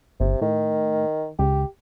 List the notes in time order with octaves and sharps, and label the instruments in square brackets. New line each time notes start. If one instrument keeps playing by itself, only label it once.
[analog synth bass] G1 [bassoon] C3
[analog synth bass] A2 [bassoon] D#3
[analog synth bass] C#2 [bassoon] G4